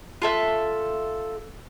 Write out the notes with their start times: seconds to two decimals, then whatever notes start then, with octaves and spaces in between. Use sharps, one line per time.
0.22 F4 A4 E5 F#6